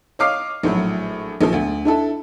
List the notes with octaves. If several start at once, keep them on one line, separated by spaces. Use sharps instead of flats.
C#5 D#5 F5 D6 F6 C7
A#1 A2 F#3
A#1 F3
D2
D4 E4 A4